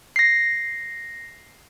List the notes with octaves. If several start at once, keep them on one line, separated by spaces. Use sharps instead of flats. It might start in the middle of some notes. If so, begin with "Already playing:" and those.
A#6 C7